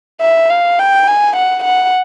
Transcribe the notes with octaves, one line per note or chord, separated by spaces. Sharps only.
E5
F5
G5
G#5
F#5
F#5